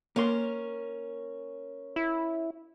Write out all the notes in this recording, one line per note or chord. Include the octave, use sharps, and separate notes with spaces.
A#3 C#4 A#4 C6
E4